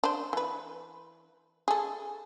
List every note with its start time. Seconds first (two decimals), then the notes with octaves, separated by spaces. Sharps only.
0.04 D4 C5
0.33 E3 B4
1.68 G#4 A4